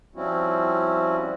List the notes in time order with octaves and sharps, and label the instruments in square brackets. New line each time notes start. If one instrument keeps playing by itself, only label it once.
[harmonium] F3 G3 C4 C#4 E4 F#4